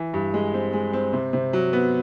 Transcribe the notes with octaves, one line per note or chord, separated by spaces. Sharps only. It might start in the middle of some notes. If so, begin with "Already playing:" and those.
Already playing: E3
G2
G#3
C4
G#3
C4
C3
C3
F#3
B3